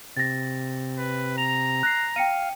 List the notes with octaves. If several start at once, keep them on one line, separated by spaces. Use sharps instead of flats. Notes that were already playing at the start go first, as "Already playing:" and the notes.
C3 A6 A#6
B4
A#5 F7
F#6 A#6 C7
F5 G5 C#7 D#7